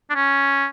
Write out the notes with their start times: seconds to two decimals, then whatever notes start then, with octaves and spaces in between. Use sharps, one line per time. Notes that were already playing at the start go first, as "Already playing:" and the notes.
0.10 D4
0.15 C#4